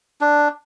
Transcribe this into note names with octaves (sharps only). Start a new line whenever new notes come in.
D4